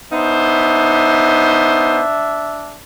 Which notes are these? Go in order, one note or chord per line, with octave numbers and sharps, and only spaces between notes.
B3 D4 D#4 C5 E5